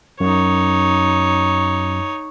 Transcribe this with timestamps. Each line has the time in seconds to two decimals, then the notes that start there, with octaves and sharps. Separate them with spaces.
0.20 F#2 D#4 C#5